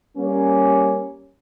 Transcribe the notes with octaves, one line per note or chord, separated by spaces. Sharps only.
G3 A#3 C#4